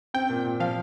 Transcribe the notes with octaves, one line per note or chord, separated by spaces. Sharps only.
C4 G5
A#2
A#2
F3 F5